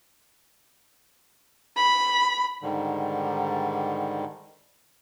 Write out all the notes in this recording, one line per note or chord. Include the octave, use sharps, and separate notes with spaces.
B5
G#2 D3 D#3 G3